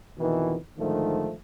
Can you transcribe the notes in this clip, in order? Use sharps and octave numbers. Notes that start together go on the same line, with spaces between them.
F2 B2 D#3 E3
G#2 D3 D#3 F3 A3